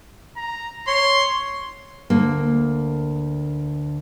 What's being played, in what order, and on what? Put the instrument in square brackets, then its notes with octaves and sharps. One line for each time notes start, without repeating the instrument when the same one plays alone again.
[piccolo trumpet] A#5
[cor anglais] C#5 [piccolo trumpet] C6
[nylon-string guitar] D2 A#3